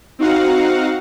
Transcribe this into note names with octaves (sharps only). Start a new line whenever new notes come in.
C4 D#4 F#4 F5 F#5